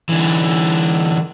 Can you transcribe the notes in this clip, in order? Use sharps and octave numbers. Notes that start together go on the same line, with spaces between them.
D3 E3